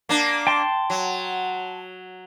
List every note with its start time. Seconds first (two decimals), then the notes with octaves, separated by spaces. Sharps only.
0.09 A#3 D4
0.47 G5 A5 C6
0.90 F#3